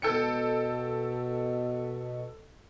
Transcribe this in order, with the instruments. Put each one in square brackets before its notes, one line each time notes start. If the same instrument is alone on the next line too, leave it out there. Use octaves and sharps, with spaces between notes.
[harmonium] B2 [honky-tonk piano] A4 G5 C#7